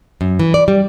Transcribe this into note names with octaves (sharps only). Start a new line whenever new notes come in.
F#2
E3
D5
G3